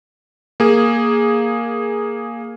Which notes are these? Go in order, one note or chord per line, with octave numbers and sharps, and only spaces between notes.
A#3 G#4